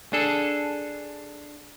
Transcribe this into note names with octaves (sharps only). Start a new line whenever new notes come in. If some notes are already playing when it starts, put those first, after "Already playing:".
D4 G#4 A4